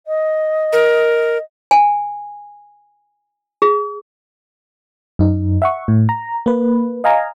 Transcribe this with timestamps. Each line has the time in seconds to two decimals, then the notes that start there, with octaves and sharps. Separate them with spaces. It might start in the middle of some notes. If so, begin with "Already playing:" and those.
0.06 D#5
0.73 A#4
1.71 G#5
3.62 G#4
5.19 F#2 D#4
5.62 E5 F#5 C#6
5.88 A2
6.09 A#5
6.46 A#3 B4
7.04 D#5 F5 G#5 A#5